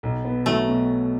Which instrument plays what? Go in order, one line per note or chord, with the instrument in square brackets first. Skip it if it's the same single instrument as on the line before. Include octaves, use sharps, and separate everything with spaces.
[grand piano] B1
B3
[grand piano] F#3 [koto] A3
[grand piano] B2